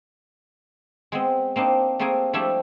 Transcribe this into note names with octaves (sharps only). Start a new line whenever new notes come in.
G#3 B3 C4
A#3 C4 D4 D#4
A3 A#3 C4 G#4 A#4 G#5
F3 G3 A3 D4 E4 G4